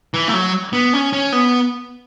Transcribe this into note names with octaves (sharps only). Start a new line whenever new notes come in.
E3
A3
F#3
B3
C#4
C#4
B3